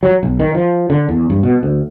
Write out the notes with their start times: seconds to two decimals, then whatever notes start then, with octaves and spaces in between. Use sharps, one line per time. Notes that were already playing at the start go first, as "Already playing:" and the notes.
0.03 F#3
0.23 B1
0.40 D#3
0.55 F3
0.90 D3
1.09 E2
1.30 G2
1.43 B2
1.63 D2